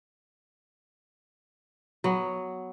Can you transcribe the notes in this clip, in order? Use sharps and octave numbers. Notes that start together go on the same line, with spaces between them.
F#3 B3